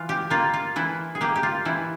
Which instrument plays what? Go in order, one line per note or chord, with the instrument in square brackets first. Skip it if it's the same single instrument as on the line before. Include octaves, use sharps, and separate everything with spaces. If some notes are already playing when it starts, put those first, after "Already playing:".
Already playing: [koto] E3 F4
G4
A#3 F4
F4
E3 E4
G#4
A#3 G4
G4
F4
E3 E4